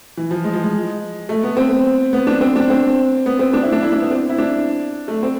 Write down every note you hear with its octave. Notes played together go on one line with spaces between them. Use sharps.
E3
F3
G#3
F3
G#3
A3
B3
C4
B3
D4
C4
D4
C4
B3
C4
D4
E4
D4
E4
D4
B3
C4
E4
D4
A3
C4